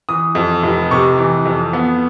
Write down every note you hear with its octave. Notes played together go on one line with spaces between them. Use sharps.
E3 D#6
F2
F1
C3 C#6
E3
F2
B3